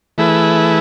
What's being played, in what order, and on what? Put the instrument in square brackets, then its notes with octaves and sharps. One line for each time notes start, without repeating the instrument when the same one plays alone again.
[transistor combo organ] E3 A3 E4 G#4 B4